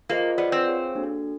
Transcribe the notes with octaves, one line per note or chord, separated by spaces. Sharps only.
A#3 F4 G#4 C5 D#5
B3 F4 G#4 B4 D5 F#5
C4
G#4 C#5 F5
A#3 D4 F#4 A4